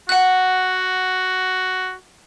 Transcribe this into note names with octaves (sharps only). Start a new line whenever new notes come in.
F#4 F#5 F#6